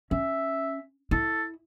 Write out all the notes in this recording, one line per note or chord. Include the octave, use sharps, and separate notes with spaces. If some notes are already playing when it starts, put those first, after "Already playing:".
C#4 E5
E4 A4